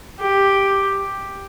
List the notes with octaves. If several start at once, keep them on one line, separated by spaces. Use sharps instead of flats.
G4